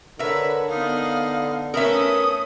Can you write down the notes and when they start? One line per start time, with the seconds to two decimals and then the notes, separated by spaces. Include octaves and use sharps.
0.19 D3 A#4 B4 C#5 E5
0.68 B3 D#4 F5
1.74 A3 C#4 A#4 B4 E5 D#6